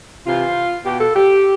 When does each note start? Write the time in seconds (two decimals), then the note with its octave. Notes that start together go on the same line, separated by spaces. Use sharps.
0.26 C3 E3 F4
0.84 B2 G4
1.00 A4
1.14 G4